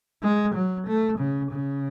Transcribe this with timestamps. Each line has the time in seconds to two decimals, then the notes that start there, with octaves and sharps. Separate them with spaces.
0.23 G#3
0.55 F#3
0.87 A3
1.19 C#3
1.52 C#3